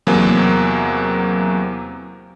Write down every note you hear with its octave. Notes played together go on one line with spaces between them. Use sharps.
E2 C3 F#3 A#3